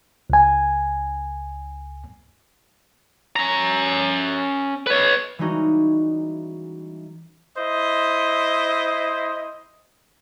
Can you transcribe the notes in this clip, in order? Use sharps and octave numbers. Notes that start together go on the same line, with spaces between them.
C#2 G#5
C#4 A#5
B4 C#5
E3 G3 G#3 C#4 D#4 F#4
E4 C5 D#5